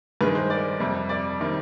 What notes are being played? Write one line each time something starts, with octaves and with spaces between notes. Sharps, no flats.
G2 D#3 G#3 B4
C5
D5
F2 C3 G3
D5
C3 D#3 G3